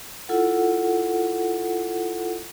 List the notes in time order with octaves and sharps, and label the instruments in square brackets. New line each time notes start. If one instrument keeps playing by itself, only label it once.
[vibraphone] E4 F4 A4 F#5